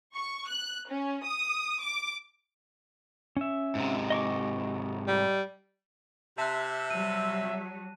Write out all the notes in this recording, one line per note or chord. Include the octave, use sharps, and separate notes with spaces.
C#6
F#6
C#4
D#6
D6
C#4 E5
G#2 C3
D#5 C#6 D6
G3
C3 E5 A5 F#6
F#3 G3 D#7